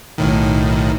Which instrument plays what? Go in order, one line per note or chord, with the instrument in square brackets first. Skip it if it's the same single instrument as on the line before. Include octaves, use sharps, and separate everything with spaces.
[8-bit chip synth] B1 A2 D#3